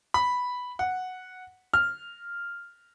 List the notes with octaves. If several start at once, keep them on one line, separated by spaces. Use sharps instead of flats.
B5
F#5
F6